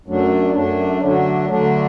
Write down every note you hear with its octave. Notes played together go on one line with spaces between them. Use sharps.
F#2 F#3 A3 D4
F#2 F#3 A3 D4
D3 F#3 A3 D4
D3 F#3 A3 D4